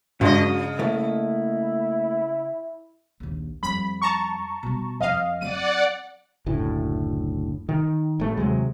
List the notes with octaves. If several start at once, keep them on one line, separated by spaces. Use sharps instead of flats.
G2 C#3 F#3 G#3 F4 D#5
A3 A#3 E4
A#1 D#2
F2 G3 B5
A5 A#5 C#6
B2 G3
F2 D#5 F5
F#3 C4 D5 F#5 D#7
F#1 D2 A2
D#3
A1 A3
D#2 C3 F#3 G#3